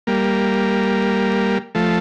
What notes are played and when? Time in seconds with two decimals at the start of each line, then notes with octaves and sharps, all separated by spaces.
0.07 G3 A#3
1.75 F3 A3